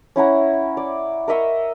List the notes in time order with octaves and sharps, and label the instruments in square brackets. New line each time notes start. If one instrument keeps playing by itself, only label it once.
[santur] C#4 E4 F#5 A#5
D5
A#4 D#5 E5 C#6